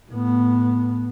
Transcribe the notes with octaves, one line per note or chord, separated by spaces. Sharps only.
A2 B3